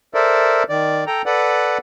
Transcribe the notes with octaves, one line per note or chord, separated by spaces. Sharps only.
A4 A#4 C5 D5 E5
D#3 D5
A4 G5 A#5
A4 B4 D5 F#5